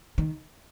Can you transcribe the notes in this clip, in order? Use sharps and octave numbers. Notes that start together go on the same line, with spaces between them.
D#3